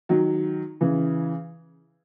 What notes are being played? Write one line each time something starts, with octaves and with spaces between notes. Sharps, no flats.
D#3 F#3
C#3 E3